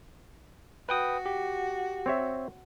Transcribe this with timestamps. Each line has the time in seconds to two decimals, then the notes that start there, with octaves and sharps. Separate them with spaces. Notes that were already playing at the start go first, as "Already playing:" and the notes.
0.89 F#4 B4 G5 D#6
1.26 G4
2.06 C4 C#5 E5